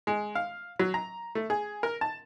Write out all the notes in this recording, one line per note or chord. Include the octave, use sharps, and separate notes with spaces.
G#3
F5
F#3
A#5
A3
G#4
A#4
A5